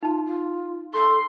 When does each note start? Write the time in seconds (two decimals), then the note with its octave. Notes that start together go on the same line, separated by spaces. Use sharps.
0.03 D#4 F4 A5
0.26 F4
0.94 A4 C6